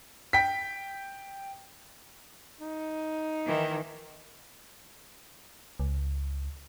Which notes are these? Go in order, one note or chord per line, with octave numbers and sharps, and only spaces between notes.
G5 B6
D#4
D#3 E3
C#2